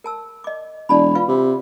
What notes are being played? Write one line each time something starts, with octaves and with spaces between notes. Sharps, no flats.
A#4 A5 E6
D#5 D6
E1 D5 A5 B5
F4 B4 F5
C3